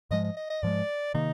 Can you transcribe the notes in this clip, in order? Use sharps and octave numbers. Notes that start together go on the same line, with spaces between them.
G#2 F3 G#3 D#5
D#5
D#5
D#5
G#2 F3 G#3 D5
C3 D#3 A#3 D#4